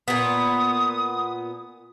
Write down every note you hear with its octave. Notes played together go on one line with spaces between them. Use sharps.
A#2 B3 D#6